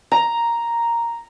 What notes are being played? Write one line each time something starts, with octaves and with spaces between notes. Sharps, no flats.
A#5